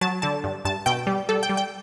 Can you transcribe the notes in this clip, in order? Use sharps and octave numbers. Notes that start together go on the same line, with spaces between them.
F#3 A5
D3 A5
G2
G2 A5
B2 G5
G3
G3 A4
G5
G3
G5